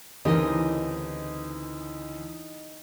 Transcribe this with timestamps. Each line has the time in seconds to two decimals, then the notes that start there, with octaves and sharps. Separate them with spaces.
0.25 D2 C#3 E3 C4 D#4 G4 A#4 D#5